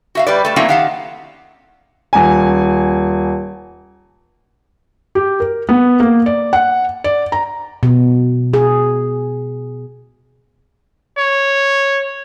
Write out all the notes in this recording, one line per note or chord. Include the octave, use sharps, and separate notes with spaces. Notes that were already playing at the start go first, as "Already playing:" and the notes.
F#4 E5 F5
G3 B4 D5
A3 A5
F#3 A3 A#3 C4 C#4 E4
D#3 G4 F5 F#5 A5
D#1 G#5
G4
A#4
B3
A#3
D5
F#5
D5
A#5
B2
G#4
C#5